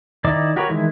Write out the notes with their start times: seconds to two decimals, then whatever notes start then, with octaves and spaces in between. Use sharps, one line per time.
0.24 D#3 D#4 E4 D5 D6
0.56 F#4 G4 A#4 B4 C#5
0.69 D#3 E3 G#3 E4